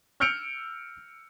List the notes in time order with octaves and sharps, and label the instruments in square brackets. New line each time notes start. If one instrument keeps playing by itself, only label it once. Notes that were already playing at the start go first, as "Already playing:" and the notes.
[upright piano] E6 F6 G6 C#7 D7 F7